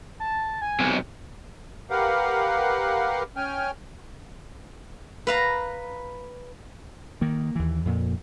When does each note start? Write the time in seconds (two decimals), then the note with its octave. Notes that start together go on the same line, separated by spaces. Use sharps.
0.20 A5
0.62 G#5
0.80 B1 C3
1.90 G4 A#4 B4 F5 F#5
3.36 C#4 G5 G#5 F6
5.27 B4 F5 A#5
7.21 D#3 A#3
7.56 D#2 E3
7.85 F2 A#2